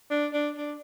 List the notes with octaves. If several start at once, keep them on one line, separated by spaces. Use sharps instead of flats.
D4
D4
D4